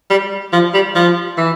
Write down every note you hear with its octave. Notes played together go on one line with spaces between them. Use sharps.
G3
F3
G3
F3
E3